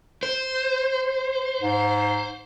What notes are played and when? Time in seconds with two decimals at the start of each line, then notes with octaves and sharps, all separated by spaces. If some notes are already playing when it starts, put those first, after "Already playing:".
0.23 C5
1.61 G#2